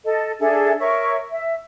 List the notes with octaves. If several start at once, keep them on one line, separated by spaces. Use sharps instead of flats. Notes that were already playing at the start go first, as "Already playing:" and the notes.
A4 D#5
D4 G#4 A4 E5
A#4 C#5 E5 C#6
E5